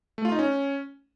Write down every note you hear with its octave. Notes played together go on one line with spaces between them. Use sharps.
A3
F4
D#4
C#4